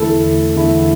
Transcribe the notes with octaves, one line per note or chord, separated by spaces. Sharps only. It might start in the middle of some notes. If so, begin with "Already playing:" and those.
Already playing: E2 D3 A3 E4 A4
E2 D3 A3 E4